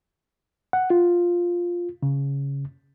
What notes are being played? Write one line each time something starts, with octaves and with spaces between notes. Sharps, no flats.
F#5
F4
C#3